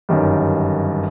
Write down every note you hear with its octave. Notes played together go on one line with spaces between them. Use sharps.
G1 F#2 D#3 G3